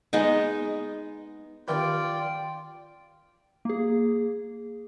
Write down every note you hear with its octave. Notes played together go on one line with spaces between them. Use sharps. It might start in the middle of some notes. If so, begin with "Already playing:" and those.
G#3 B3 D#4
D#2 D#3 F4 B4 D5 G5
A#3 G#4